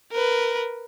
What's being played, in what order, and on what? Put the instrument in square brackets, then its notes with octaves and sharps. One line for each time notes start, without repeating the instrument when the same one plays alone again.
[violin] A#4 B4